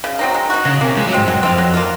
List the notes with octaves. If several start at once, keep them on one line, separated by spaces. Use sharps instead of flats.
C#3
F#3 C4 D#4
G#3
D#4 F#4
C#3 F#3
C3 A#3 C#4
F3 G#3
F#3
G#2 G#3 C4
F#2 F#3
F2 C4 F4
F#3
A#3 F4